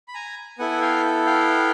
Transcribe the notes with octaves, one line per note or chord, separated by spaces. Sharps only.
B5
G#5 A#5
B3 E4 A4 F#5 G#5
F5 G5
F5 G5